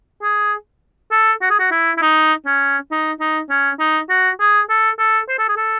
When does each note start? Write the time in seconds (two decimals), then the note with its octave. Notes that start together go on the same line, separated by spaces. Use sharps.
0.22 G#4
1.11 A4
1.42 F#4
1.50 G#4
1.59 F#4
1.71 E4
1.97 E4
2.02 D#4
2.46 C#4
2.91 D#4
3.20 D#4
3.50 C#4
3.79 D#4
4.09 F#4
4.40 G#4
4.69 A4
4.99 A4
5.29 C5
5.38 A4
5.48 G#4
5.57 A4